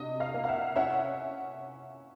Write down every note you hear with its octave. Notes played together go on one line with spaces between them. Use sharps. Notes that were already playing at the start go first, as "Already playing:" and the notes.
Already playing: C3 D4 D#5
D#5 F5
A#3
F5
E5 F#5
C#4 E5 F#5